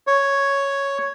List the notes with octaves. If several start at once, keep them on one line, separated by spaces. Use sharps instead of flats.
C#5